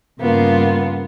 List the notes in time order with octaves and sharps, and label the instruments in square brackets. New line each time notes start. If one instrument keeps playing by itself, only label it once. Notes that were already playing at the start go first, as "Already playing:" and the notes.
[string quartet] G2 C#3 G3 A#3 B3 F4